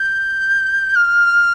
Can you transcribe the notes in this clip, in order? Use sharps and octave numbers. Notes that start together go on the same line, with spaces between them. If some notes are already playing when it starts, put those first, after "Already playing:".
Already playing: G6
F6